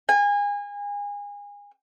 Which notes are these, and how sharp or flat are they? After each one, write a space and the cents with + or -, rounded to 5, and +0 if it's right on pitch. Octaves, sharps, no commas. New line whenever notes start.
G#5 -30